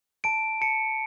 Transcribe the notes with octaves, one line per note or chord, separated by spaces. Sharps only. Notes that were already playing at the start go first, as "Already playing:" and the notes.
A5 D7
A5 C#7